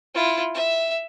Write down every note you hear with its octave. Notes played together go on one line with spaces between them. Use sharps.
E4 F4
E5